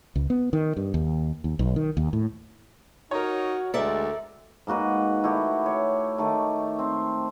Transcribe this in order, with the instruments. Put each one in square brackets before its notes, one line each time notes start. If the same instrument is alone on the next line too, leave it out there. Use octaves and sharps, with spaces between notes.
[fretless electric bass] C#2
B3
D#3
G2
D#2
D#2
B1
D#3
D#2
A2
[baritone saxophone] D#4 [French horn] F#4 [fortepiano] A#4 C#5
[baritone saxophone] D2 [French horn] G#3 [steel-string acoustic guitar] A4 A#4 E5 [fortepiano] D5
[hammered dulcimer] G#2 A#3 F#4 B4
A3 E4 F#4 G4
G4 C#5
D#3 A3
C4